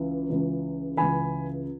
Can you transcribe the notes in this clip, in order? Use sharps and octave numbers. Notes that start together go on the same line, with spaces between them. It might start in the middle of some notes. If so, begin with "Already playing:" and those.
Already playing: C#2 C#3 E3
C#2 C#3 E3
C#2 C#3 E3 G#5 B5